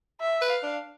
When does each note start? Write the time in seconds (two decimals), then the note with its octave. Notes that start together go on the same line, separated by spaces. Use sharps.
0.21 E5
0.42 B4
0.50 F5
0.63 D4